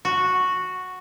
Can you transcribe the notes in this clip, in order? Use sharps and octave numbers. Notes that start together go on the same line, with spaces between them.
F#4